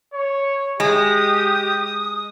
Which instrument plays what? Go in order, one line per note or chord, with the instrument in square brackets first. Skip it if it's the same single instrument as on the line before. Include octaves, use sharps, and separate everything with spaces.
[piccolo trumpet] C#5
[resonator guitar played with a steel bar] G#3 [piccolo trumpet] G4 [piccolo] D#6